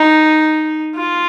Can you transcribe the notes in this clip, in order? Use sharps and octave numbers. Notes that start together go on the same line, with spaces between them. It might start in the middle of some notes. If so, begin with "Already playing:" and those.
Already playing: D#4
F4